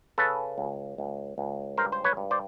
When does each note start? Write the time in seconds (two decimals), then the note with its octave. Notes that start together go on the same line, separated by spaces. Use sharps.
0.18 C#3 A4 B4
0.58 C#2
0.98 C#2
1.38 C#2
1.78 G2 A#4 C5
1.92 C5
2.04 B4 C#5
2.17 G2
2.31 C5 D5